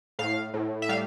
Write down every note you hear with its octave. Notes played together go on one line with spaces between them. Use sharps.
A2 F5
A2
E5
G3 F5